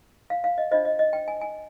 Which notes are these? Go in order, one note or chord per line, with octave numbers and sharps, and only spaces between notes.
F5
F5
D#5
D4 F4 C5 D#5
D#5
D#5
G5
G#5
G#5